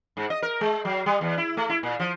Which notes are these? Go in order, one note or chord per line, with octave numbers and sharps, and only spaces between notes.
G#2
D#5
A#4
G#3
F#3
G3
E2
E4
A3
E4
A#2
F3